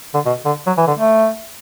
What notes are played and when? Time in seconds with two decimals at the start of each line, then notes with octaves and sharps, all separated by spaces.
0.14 D3
0.25 B2
0.45 D3
0.66 F#3
0.77 E3
0.87 D3
0.98 A3